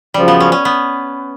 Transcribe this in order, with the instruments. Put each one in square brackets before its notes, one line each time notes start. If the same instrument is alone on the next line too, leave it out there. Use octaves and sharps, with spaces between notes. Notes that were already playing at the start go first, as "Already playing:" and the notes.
[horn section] F#2 C#3 F3 [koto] G3
[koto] B3
C#4
C#4
B3